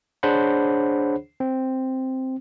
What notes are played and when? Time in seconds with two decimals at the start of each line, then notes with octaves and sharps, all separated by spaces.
0.23 D4 G#4 C5 C#5 F#5 B5
1.40 C4